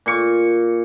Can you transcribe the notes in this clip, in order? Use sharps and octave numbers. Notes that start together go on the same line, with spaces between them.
A#2 C#6